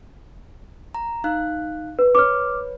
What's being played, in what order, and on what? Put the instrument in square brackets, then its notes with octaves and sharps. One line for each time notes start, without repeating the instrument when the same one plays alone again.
[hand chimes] A#5
D#4 F5 F#6
[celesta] B4
[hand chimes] B4 C#5 [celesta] D6 F6